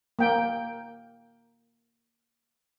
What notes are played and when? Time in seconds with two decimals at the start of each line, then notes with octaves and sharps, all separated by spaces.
0.19 A#3 G5